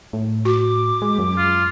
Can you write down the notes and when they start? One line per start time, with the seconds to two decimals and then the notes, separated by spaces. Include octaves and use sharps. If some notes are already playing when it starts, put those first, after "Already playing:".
0.13 A2
0.45 F#4 D6
1.02 G#3
1.19 F#2
1.37 F4